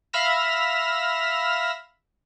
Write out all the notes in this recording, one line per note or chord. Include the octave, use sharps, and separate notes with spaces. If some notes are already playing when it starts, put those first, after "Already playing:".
E5 F5 B5 F6 A#6 E7